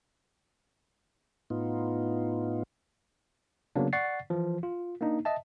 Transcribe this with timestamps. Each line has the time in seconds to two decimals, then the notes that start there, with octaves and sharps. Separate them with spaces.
1.50 A2 B3 D#4 F4
3.76 C#3 F#3 A#3 B3 D4
3.93 D5 F#5 C#6 A6 C7
4.30 E3 F3
4.63 F4
5.01 A#3 D4 D#4
5.25 D#5 E5 A5